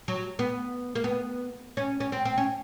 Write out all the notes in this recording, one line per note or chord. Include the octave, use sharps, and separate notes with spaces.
F#3
B3
A#3
B3
C#4
C#4
C4
C4
C#4